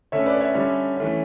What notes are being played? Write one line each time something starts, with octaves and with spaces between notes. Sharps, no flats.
D3 A3 C#4 C#5 E5
B4 D5
C#5 E5
D3 G3 C#4
E3 A3 C#4